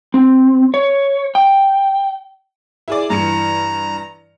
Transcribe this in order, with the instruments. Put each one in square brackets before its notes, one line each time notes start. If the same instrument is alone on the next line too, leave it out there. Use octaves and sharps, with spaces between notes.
[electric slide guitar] C4
C#5
G5
[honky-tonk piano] E4 G#4 D5
[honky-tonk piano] G2 E3 C#7 [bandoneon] A#5